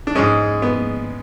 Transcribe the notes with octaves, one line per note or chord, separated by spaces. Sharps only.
D4
G#2 G#3 C#4
B3